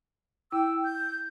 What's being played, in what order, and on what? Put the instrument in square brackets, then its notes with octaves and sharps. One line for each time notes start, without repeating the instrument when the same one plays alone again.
[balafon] E4 [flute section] G5 E6
[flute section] G6